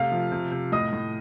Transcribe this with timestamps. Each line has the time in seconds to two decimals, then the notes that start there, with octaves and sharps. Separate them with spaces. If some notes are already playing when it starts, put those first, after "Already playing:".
Already playing: C3 A3 F5 F6
0.12 F3
0.32 C3
0.52 C3
0.72 A2 D#5 D#6
0.93 A2